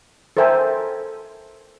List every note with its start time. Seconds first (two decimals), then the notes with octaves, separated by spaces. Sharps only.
0.37 A4 A#4 C5 E5 G5 G#5